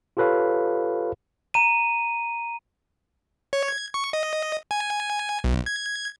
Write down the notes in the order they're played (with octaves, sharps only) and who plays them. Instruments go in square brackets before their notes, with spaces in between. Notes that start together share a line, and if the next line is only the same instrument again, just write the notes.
[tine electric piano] F4 G4 A4 B4 C#5 F5
[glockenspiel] A#5 D#7
[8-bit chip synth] C#5
G#6
C#6
D#5
G#5
B1
G#6